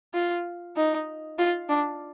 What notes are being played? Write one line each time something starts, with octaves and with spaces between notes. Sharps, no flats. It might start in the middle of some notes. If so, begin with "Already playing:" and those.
F4
D#4
F4
D4